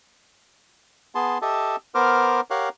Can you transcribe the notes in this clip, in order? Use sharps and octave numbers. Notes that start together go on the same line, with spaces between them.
B3 G#4 A5 C6
G4 A4 D#5 E5 A5
B3 A#4 C5 D6 F6
G4 A#4 C#5 F5 F#5